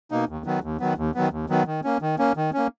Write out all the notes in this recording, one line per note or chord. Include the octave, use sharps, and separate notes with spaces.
B2 A#3 D#4
D#2
D#3 F#3 B3
D#2
D#3 F#3 B3
D#2
D#3 F#3 B3
D#2
D#3 F#3 B3
D#3
A#3 C#4
D#3
A#3 C#4
D#3
A#3 C#4